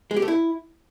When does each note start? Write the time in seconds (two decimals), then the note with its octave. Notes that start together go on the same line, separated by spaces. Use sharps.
0.11 G#3
0.16 G4
0.22 A3
0.28 E4